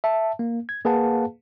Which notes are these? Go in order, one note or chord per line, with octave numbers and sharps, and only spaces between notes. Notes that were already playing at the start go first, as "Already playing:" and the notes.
E5 A5
A#3
G#6
A#3 G#4 B4 F5 F#5 A5